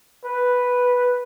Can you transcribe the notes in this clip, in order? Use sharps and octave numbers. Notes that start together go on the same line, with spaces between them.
B4